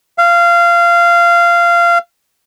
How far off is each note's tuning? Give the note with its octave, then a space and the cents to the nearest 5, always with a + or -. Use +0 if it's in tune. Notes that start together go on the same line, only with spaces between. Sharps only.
F5 -20